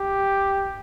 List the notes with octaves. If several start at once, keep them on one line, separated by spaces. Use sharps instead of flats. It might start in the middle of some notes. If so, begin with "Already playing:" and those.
Already playing: G4